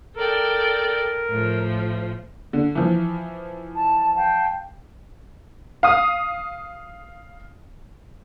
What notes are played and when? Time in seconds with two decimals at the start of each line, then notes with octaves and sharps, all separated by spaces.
0.16 A4 A#4 D5 G5
1.28 A2 F3
2.53 D3
2.75 E3 F3
3.75 A5
4.15 F5 G5 A5
5.83 F5 D#6